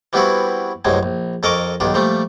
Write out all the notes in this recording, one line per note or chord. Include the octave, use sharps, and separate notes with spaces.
E3 G3 B3 C4 E4 F#4
A1 F#2 C3 G#3
A#1
F2 A4 A#4 D#5 C#6 D6
B1 G2 D#3 D4
A#2 F3 G3 A3